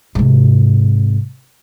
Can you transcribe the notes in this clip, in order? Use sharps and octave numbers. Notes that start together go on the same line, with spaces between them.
G#2 C3